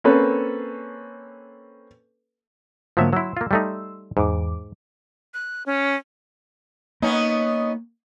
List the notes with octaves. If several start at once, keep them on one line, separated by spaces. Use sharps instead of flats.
A#3 C4 C#4 A4 B4
G#2 D3 F3 F#3 A#3 E5
F#3 E4 C6 E6
A#3 F4
G3 A3 D#4
E2 G#2 D6
F#6
C#4
A#3 B3 C#4 D#4